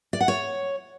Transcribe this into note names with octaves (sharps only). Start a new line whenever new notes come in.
D5
F#5
C#5